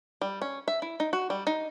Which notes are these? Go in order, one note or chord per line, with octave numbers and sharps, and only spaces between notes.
G3
C#4
E5
E4
D#4
F#4
G3
D#4